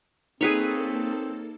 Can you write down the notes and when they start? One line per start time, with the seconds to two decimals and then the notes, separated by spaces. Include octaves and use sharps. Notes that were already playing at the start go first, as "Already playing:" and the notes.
0.41 A#3 C4 D#4 G#4 A4 B4 C#5